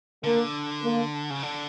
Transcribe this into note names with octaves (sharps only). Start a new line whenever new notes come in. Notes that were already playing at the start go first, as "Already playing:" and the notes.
D3 A#3
A#3
C#3
D3